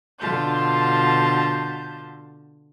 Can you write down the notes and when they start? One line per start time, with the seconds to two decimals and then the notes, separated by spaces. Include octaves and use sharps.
0.20 B2 D3 F4 A5 G6